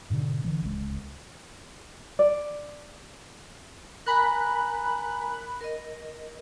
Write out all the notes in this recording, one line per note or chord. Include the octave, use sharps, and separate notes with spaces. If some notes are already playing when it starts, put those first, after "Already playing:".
G#2 B2 D3
D3 E3 G#3
D1 C#2 G#3
D5
A#4 G#5 A#5 B5 F#6
A#4 D#5